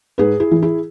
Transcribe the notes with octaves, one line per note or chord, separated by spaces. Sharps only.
G#2 G#4 B4
E4 G#4
E3
E4 G#4